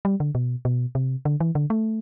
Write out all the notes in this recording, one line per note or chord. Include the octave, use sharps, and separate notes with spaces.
G3
D3
B2
B2
C3
D3
E3
D3
A3